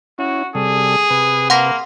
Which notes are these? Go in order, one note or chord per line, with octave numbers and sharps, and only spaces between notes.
C#4 E4 F#4
C3 G3 G#4 A4
C3 B4
A#3 F#5 C6 A#6